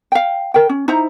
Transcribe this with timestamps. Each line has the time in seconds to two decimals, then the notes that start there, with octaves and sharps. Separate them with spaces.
0.12 F5 G5
0.54 A#4 G5
0.69 C#4
0.88 D#4 E4 C5 A#5